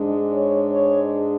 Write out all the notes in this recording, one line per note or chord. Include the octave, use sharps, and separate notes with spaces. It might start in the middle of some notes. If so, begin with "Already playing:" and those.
Already playing: G#2 G#3 D4
C#5
C#5